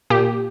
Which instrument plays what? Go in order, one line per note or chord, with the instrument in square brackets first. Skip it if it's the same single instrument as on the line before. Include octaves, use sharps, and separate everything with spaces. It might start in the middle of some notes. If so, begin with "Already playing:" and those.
[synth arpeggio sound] A#2 G4